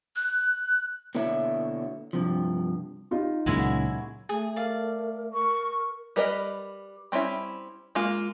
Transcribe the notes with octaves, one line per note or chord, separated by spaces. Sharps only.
F#6
B2 D3 A#3 E4 C#5 E5
G2 C3 F3
D#4 F4 G4
C#2 A#2 C#3 F#3 G#3 E4
A3 G#4
A#4 D5 F5
A#4 C#6
G3 A#4 B4 D5 D#5
G3 C4 C#4 E4
G#3 A#3 F4